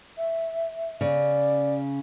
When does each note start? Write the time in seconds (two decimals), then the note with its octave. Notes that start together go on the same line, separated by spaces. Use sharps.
0.18 E5
1.01 C#3 D5